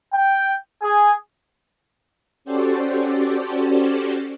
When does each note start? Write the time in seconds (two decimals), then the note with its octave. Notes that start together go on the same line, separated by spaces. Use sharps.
0.13 G5
0.82 G#4
2.45 C#4 F#4 G4 A4 C5 D5